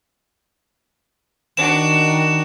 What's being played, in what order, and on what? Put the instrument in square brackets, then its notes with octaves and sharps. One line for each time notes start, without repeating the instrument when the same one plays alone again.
[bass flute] D#3 [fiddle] D4 F#4 [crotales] E7